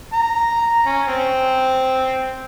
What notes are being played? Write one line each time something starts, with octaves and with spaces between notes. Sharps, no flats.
A#5
C#4
C4